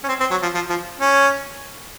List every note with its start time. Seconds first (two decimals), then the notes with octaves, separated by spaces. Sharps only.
0.04 C#4
0.08 C4
0.20 C4
0.31 F#3
0.43 F3
0.55 F3
0.70 F3
1.00 C#4